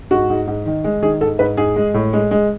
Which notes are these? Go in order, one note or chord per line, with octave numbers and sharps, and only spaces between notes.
G#2 F#4
G#2
G#2
D#3
G#3
D#3 G#4
G#2 A4
G#2 B4
G#2 G#4
G#3
A2
G#3
G#3